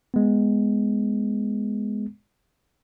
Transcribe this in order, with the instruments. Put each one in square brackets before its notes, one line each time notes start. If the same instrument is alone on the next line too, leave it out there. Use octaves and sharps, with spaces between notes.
[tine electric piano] G#3 B3